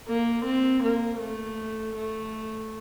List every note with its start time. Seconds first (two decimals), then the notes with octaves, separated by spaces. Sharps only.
0.08 A#3
0.45 C4
0.83 A#3
1.20 A3
1.96 A3